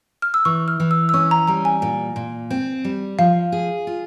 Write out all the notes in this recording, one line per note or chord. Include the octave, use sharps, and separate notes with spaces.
F6
E6
E3 C#6
F6
E3
E6
E6
C#4 C#6
A#5
G3 A#5
G#5
A#2
A#2
C4
G3
F3 F5
G#4
F4